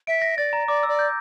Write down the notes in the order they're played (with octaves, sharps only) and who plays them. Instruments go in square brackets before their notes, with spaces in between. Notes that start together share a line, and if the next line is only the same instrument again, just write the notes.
[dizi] E5 [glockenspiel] D7
[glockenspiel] A#6
[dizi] D5 [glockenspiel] A6
[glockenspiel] A#5
[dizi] D5 [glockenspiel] D6
[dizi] D5 [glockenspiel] E6
[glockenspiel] G6